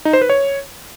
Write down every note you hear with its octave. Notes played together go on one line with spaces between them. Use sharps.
D#4
C5
B4
C#5